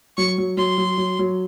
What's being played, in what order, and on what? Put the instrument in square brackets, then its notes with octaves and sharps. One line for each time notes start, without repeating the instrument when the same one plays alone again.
[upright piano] F#3 [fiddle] C#6
[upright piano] F#3
[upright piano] F#3 [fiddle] C6
[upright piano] F#3
F#3
F#3